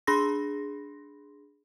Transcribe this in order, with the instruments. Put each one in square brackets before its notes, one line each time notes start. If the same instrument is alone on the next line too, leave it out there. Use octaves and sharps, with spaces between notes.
[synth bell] D4 G#4 B5 C6 A#6